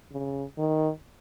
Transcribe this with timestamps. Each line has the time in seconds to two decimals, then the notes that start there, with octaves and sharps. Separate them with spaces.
0.12 C#3
0.58 D#3